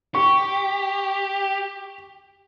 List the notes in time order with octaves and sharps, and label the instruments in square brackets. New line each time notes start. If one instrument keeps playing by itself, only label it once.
[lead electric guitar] G4 [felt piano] C#6